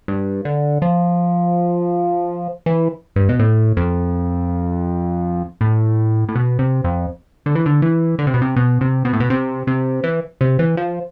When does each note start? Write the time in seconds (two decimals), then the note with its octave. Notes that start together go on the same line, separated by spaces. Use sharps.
0.08 G2
0.45 D3
0.82 F3
2.66 E3
3.16 G2
3.29 B2
3.39 A2
3.77 F2
5.61 A2
6.29 A2
6.36 B2
6.59 C3
6.84 F2
7.46 D3
7.55 E3
7.66 D3
7.82 E3
8.19 D3
8.27 C3
8.34 B2
8.42 C3
8.56 B2
8.81 C3
9.05 B2
9.13 A2
9.20 B2
9.30 C3
9.67 C3
10.04 E3
10.41 C3
10.59 E3
10.77 F3